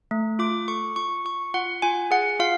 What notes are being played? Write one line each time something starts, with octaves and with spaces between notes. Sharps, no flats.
A3
F4 D6
A4 C#6
F4 C#6
F4 C#6
F4 F#5
F4 G#5
G#4 F#5
F4 F5